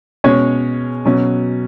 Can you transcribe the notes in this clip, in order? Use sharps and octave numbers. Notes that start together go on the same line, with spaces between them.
B2 G#3 C#4 G#4 C#5
B2 F#3 C#4